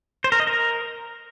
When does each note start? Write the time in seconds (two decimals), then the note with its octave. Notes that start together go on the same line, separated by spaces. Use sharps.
0.24 C5
0.32 A#4
0.40 D#5
0.47 A#4